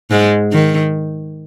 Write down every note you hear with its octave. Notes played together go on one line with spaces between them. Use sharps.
G#2 G#3
D#3